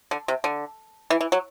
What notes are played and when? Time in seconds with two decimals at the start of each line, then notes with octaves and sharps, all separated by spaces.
0.11 D3
0.28 C3
0.44 D3
1.10 E3
1.21 E3
1.32 F#3